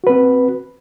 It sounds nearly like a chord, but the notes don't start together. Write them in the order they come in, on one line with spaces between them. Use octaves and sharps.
F#4 B4 C4